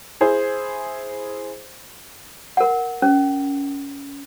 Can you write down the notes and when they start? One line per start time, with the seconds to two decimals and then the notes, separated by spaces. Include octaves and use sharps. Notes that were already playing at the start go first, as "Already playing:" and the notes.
0.21 E4 G#4 C5
2.57 A#4 F#5
3.02 C#4